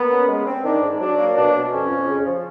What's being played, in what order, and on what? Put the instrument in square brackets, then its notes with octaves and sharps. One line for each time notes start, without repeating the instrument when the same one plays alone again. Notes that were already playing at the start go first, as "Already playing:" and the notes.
Already playing: [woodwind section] A#3 [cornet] B3
[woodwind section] C#4
G#3
C4
[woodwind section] D#3 [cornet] D4
[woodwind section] G#2
[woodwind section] F#3 [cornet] D4
[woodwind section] A#3
[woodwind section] B2 [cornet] D4
[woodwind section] B2
[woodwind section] F2 [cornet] C#4
[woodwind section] F2
C#3
F3